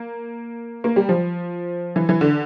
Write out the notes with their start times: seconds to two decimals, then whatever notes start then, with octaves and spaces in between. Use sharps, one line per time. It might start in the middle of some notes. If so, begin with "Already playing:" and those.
Already playing: A#3
0.84 A#3
0.96 G3
1.09 F3
1.96 E3
2.09 E3
2.21 D3